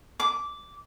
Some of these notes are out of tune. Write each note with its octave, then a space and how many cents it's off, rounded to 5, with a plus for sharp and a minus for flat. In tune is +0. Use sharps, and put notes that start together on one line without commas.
D6 -10